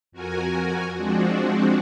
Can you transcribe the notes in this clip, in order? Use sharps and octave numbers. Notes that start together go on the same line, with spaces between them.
F2 F#4 A#4 G#5
F3 G#3 C4 D4 F#4